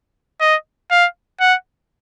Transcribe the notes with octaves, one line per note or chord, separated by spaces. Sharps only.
D#5
F5
F#5